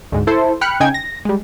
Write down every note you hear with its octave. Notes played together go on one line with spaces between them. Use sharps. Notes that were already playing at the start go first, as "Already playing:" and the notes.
D2 G#2
E4 A4 C5
G5 B5 F6 F#6 C#7
C#3 D#4 G5 G#5 G#6
A#6
G3 G#3